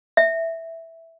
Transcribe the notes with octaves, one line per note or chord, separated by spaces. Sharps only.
E5